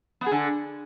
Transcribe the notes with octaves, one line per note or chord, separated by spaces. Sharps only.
B3
G#4
D3